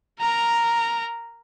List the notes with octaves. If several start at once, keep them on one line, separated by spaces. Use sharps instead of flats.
A#4 A#5